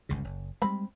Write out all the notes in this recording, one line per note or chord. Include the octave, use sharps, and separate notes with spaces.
G1 C#2 C#3
F#1
G3 G#3 C4 B5